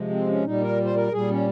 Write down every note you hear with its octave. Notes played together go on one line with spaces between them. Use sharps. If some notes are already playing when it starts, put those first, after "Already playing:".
Already playing: C3 F3 G#3
C4
C#4
A#2 G3 D#4
A#4
C5
A#4
A#2 G3 G#4
C#4